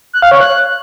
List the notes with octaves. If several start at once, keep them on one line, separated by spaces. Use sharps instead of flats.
F#6
F5
C#5
F#6